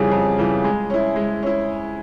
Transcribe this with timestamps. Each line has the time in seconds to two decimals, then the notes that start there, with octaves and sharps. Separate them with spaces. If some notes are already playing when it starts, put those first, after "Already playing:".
Already playing: F2 C#3 E3 G3 G#4
0.11 F2
0.38 C#3 E3 G3
0.64 G#3
0.90 C#4 E4
1.16 G#3
1.43 C#4 E4